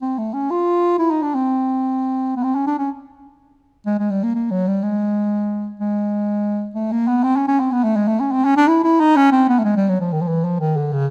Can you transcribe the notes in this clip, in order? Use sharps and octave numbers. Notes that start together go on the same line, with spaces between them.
C4
A3
C#4
F4
E4
D#4
D4
C4
B3
C4
C#4
D4
C#4
G#3
G#3
G3
A#3
A#3
F#3
G3
G#3
G#3
A3
A#3
B3
C4
C#4
C#4
C4
B3
A3
G#3
A3
C#4
C4
C#4
D4
E4
E4
D#4
C#4
C4
B3
A3
G#3
G3
F#3
F3
D#3
F3
E3
F3
D#3
D3
C#3